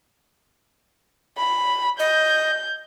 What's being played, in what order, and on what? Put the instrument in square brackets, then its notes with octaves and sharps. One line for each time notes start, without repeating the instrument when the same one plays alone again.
[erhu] B5
[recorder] D#5 [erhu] G6